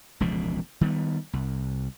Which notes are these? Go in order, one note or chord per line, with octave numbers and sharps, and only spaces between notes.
E1 C#2 A#2 F3
D#3 G3 A3 B3
C2